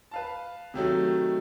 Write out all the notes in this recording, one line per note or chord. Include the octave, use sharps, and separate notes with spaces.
B4 F5 A5
C3 D#3 F#3 A3